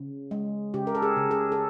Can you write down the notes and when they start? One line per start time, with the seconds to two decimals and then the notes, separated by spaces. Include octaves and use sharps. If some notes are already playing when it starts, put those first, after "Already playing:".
Already playing: C#3
0.31 G#3
0.74 C#3 G4
0.87 A#4
0.95 A4
1.02 G#4
1.17 C#3
1.31 G#4
1.52 A4